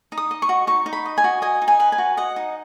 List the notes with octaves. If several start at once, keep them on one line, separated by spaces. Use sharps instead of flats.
D#4
D#6
D#5
C#6
F#4
D#4 C#6
D#4
B5
D#5
G#5
F#4
D#5 G#5
D#4
G#5
B4
G#5
F#4
D#5 F#5
D#4